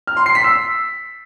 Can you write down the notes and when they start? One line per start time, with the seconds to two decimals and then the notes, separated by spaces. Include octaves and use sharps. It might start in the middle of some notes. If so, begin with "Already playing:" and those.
0.07 F6
0.17 C6
0.26 C7
0.35 B6
0.44 E6